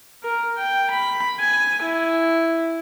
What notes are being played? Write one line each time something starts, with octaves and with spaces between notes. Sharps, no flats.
A#4
G5
B5
G#5
E4